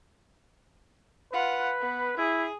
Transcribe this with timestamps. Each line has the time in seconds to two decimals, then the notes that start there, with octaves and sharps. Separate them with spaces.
1.33 F4 B4 F#5
1.81 B3
2.17 E4 G#4